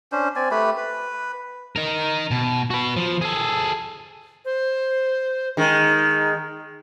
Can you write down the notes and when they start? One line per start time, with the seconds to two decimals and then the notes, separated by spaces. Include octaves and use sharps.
0.12 C#4 D4 C5
0.36 C4 D5 G#5
0.51 A3 G4 B4 B5
0.77 B4
1.76 D#4 A#4
2.31 B2
2.70 F#4 B4
2.96 F3
3.21 G#4 A4
4.45 C5
5.57 D#3 G#3 D#4